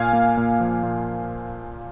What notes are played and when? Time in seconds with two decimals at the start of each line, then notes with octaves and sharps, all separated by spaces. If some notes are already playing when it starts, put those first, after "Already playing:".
Already playing: A#2 F5 G#5
0.13 A#3
0.37 A#2
0.60 F3
0.83 A#2